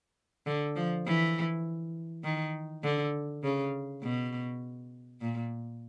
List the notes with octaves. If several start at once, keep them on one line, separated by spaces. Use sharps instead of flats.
D3
F3
E3
D#3
D3
C#3
B2
A#2